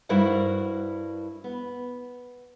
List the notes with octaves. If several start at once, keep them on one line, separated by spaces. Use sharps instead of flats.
G2 E4 F#4 A#4 C5 F#5
B3